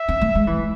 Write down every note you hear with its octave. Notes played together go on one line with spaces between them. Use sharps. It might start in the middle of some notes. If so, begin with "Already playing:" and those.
Already playing: E5
C4
A3
G#3
E3